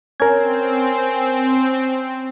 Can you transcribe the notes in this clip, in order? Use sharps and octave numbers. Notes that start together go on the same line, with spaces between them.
C4 C#4 A#4 G#6